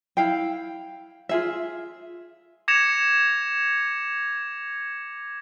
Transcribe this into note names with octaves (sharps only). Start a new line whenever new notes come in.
E4 F5 G5
F4 G#4 E5
D6 G#6 A#6 C#7 E7 F7